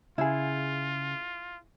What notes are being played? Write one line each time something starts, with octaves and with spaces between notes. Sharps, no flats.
C#3 E4 F4 G#4